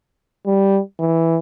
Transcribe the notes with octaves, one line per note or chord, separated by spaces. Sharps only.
G3
E3